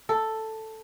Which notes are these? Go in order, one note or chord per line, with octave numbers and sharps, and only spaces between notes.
A4